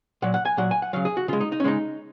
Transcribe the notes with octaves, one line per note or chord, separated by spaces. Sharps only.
A#2 F#3 F#5
F#5
G#5
A#2 F#3 F#5
G#5
F#5
C#3 F#3 F5
G#4
F#4
C#3 G#3 F4
D#4
D#4
C#4
C#3 G#3 D#4